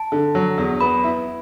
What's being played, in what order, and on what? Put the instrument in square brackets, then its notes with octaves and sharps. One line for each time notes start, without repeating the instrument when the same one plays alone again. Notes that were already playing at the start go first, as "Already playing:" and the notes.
Already playing: [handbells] A5
[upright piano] D3
F#3
E2
[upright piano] B3 [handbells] B5
[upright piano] E4